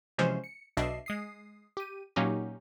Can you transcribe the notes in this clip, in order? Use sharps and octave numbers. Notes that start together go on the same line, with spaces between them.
C3 E3 F3 G#3 C#4 C5
C#7
B1 B2 D4 D#5 E5 C7
G#3 D#6 C7
G4 D#7
A#2 F#3 A#3 C#4 D#4 G4